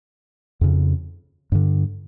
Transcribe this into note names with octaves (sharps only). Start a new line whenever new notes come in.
F2 C#3
G2 D3